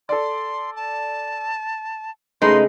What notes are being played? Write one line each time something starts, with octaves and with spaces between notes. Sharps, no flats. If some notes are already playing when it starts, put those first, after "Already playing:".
A4 D5 C6
A5
C#3 G#3 A3 D#4 B4 C6